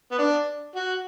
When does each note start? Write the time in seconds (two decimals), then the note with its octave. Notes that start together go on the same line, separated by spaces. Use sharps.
0.11 B3
0.18 D4
0.75 F#4